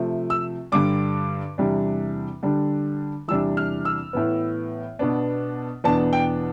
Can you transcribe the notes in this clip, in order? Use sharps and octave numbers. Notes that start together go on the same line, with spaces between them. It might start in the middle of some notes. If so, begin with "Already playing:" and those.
Already playing: C3 F3 A3
E6
G2 D3 G3 D4 D6
E2 C3 G3 D4
D3 G3 D4
E2 C3 G3 D4 E6
F6
E6
A2 E3 B3
B2 B3 D4
E2 B2 B3 D4 A5
G5